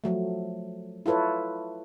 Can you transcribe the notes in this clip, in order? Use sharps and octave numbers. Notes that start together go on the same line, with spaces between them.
F3 F#3 A3
E4 F4 A4 B4 C#5